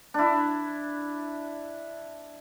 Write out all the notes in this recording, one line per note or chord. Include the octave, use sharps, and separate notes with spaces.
D4 E4